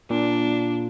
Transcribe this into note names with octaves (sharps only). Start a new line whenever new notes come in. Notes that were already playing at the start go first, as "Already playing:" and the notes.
A#2 D4